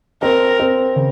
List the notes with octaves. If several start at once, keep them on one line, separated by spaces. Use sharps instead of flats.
C4 A#4
C4
C#3